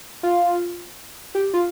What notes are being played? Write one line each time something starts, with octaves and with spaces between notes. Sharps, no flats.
F4
G4
F4